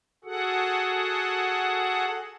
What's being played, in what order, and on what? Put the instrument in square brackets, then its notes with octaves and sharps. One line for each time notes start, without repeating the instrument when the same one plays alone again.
[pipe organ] F#4 G#4 A4 F#5